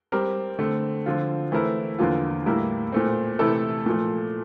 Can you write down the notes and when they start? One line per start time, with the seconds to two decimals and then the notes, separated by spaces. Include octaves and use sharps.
0.12 G3 C4 G4 A#4
0.59 D3 A3 C4
1.06 D3 F3 C4 F4
1.52 E3 A3 C4 E4 A#4
1.99 E2 D3 F3 A#3 F4
2.46 A2 G3 A#3 E4 A#4
2.92 A#2 A3 C4
3.39 C3 E3 A3 E4 A4
3.86 A#2 F3 A3